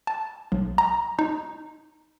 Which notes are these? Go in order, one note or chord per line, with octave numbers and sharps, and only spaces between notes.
A5
B1
A#5
D#4